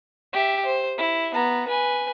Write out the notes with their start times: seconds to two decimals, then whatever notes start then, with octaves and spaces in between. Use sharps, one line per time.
0.33 G4 E5
0.66 C5
0.98 E4
1.34 B3 A#5
1.68 B4 G#5